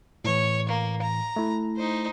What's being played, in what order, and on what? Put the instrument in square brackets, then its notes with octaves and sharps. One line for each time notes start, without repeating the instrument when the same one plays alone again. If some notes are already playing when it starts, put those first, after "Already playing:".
[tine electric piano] A2 E3 [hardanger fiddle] C#5
[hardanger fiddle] A#3
A#5
[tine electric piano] A3 E4
[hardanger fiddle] D#4 C5